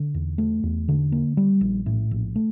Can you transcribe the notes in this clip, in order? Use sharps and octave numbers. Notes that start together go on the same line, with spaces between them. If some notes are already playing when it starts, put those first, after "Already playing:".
Already playing: D3
E2
A3
E2
D3
A#3
G3
A#1
A2
A#1
A3